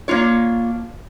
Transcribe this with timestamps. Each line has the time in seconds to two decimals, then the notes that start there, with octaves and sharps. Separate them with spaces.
0.08 A#3 D4 F4 C#5